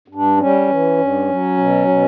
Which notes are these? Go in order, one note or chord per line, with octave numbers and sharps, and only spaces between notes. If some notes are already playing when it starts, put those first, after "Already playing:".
G2
D4
G3 C#4
E3
G2
F#3
B2
B2